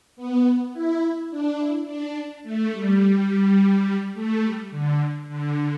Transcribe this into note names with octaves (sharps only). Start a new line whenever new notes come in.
B3
E4
D4
E4
D4
A3
G3
G3
G3
A3
G3
D3
D3